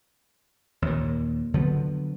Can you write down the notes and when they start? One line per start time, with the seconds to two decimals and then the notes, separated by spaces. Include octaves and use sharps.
0.82 D#2 A#2
1.54 D3 F3 F#3 B3